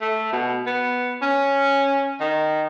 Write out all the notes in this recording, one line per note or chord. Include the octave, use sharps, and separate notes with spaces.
A3
B2
B3
C#4
D#3